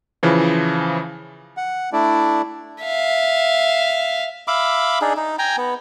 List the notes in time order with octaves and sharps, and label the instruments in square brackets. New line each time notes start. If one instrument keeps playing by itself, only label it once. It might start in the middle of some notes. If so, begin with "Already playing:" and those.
[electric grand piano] C#3 E3 F3
[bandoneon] F#5
A3 D4 E4 D5
[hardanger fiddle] E5 F5
[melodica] E5 F5 B5 D6
D4 D#4 G#4
D#4
G5 G#5 A#5
B3